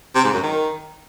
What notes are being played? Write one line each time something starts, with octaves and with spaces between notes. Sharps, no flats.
C3
G#2
F#2
D#3